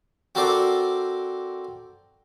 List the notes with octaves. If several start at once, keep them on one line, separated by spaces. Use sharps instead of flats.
C4 F#4 A4 A#4 C5 D5